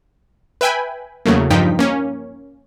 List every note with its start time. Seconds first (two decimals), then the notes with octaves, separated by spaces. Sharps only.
0.61 B4 E5 G5 G#5 B5
1.26 E2 C#3 F#3 A3 A#3
1.50 G2 F3 D#4 G5 B6
1.79 A#3 C#4